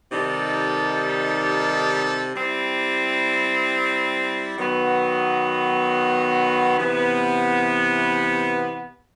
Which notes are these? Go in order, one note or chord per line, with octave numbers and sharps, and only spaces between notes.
C3 D#3 G3 D#4 A4
G3 C4 E4
D#3 F#3 B3
C3 E3 B3